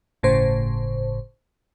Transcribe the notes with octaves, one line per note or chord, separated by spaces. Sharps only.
G1 A2 C#3 C5